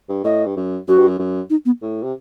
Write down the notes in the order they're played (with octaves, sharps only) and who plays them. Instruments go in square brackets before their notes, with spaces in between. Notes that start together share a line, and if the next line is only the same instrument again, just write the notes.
[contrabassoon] G2
[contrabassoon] A2 [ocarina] D#5
[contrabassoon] G2
F#2
[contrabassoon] F#2 [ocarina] F#4
[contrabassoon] G2
F#2
F#2
[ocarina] D#4
B3
[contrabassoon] A2
C3